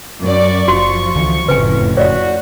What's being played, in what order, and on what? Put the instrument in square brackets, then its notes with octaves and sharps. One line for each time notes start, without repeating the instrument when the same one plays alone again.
[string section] F#2 D5 [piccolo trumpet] C#6
[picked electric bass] F#1 [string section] F3 [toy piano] F#4 C6
[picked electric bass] C#2 D3 E3
[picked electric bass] F#1 C#3 [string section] F2 A2 [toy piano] B4 G#5
[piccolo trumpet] F#4 [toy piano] C#5 D5 F5